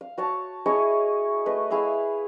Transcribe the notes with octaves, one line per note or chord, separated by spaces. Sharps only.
F5
F#4 C#5 A5
E4 G#4 C#5 D#5
A3 B4 D#5
E4 G#4 F5 E6